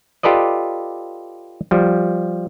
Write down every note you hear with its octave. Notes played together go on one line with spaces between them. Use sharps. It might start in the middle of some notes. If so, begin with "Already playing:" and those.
F4 G4 A4 B4 D5 D#5
F3 G3